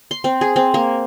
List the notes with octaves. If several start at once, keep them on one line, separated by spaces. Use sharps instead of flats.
C6
C4
G#4
C4
A#3